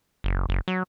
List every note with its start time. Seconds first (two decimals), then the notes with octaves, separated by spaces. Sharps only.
0.24 F#1
0.49 F#1
0.68 F#3